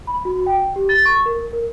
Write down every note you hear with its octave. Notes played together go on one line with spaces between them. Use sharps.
B5
F#4
G5
G4
A6
C#6
A#4
A#4